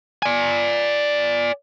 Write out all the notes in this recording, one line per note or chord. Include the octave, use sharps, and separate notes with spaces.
D5 G#5